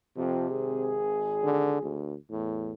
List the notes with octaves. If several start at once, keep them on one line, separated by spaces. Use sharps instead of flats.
F2 C3
G#1 G#4
D3
D2
E2 A2